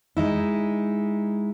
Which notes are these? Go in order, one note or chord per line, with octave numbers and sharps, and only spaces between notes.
G#3 D#4 E4